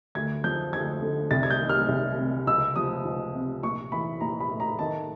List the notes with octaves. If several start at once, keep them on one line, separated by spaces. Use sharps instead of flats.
D2 G#6
F3 G6
D2 G#6
D3
C2 A6
G#6
G6
D#3
F6
C2
C3
C#2 E6
F3 D#6
C#2
C3
A#1 C#6
E3 B5
A#1 A#5
B5
A2
A#5
D#3 A5